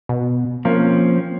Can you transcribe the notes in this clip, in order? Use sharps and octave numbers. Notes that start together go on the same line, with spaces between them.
B2
F3 A#3 C4 C#4